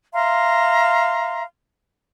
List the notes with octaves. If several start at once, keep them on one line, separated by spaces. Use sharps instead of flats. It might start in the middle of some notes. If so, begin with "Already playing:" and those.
E5 F5 A#5 C6